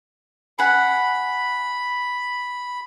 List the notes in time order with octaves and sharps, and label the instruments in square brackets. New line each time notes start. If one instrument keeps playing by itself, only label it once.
[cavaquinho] G#4 F#5 [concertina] B5